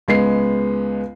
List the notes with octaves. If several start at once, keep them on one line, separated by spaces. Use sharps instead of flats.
C#2 G#3 B3 C7